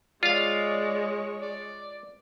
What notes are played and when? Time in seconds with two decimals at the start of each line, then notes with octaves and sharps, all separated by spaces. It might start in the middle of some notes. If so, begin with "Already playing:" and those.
0.23 G#3 F4 C#5 D5 F5
1.42 D5